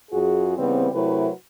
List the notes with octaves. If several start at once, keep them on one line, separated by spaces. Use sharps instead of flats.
F#2 F4 F#4 G#4
C#3 E3 G3 B3 C4
C3 F#3 A3 E4 A#4 B4